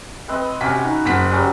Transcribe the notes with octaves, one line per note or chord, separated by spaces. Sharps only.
C4 B4 D#5
C3 C#4 F#4 G#5 B6
D#4
F#1 F#5 B6
F#3 G3 C#4